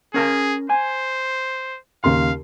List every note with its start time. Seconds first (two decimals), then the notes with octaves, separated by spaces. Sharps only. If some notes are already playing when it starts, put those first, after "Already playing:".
0.14 C#4 G#4 A#4 A5
0.70 C5 G#5
2.04 D#2 C#3 F5 C6